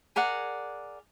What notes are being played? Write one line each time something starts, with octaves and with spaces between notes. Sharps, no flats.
G#4 A#4 D5 F#5